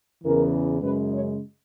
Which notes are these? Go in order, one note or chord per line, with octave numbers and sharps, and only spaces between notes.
E2 C#3 E3 A#4
F#2 C#3 G#3 B4
C#5